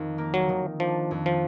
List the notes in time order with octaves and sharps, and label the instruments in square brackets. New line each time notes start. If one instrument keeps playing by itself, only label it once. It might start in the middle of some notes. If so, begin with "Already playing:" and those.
Already playing: [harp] F2 D#3 D#4
A#3
[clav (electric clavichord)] F#3
[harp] D#3
[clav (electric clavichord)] F3 [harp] D4
[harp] F2
[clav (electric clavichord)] F3